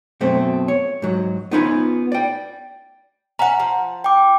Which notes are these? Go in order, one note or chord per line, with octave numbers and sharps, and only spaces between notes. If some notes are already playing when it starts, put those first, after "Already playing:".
F#2 B2 A3 C4
C#5
G#2 F#3
B3 C#4 D#4 F4 B4 G#5
D5 G5
C#4 E5 F#5 A#5
F3
G5 D6